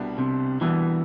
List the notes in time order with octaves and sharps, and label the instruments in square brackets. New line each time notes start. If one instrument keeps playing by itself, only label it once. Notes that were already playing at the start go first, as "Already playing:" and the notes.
Already playing: [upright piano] C2 B2 G3 B3 D4
[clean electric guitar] C3
[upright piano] C2 B2 G3 B3 D4 [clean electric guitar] E3